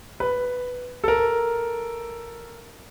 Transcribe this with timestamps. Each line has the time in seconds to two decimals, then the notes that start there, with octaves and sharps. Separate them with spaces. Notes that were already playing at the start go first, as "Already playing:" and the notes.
0.20 B4
1.04 A4 A#4